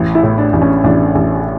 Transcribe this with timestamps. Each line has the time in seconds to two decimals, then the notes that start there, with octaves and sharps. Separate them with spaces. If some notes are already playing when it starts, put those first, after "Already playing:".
Already playing: A1
0.15 E4
0.23 A2
0.38 D4
0.53 A1
0.62 C#4
0.84 A1 D4
1.15 A1